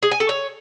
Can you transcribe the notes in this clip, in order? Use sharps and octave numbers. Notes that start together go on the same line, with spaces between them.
G#4
G#5
A4
C#5